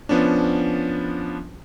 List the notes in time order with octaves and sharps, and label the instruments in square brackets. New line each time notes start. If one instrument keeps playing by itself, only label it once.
[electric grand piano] F3 B3 C#4 D4